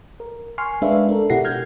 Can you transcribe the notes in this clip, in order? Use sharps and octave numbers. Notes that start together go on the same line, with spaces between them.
A#4
G#5 C6 C#6 F6 C7
G#3 D4 A#4 B4 E5 F5
D4 A4 A#4
B2 E4 G4 F#5 A#6 C7
F6 G6 G#6